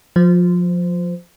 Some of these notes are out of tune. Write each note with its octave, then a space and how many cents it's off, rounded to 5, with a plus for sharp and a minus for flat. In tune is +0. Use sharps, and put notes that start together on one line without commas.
F3 +25 C5 -20